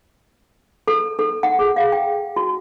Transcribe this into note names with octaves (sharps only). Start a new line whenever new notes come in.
A4
A4
F#5
G#4
F5
G5
F#4